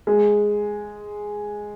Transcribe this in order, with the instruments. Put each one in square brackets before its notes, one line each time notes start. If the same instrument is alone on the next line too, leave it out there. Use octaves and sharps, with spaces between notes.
[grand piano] G#3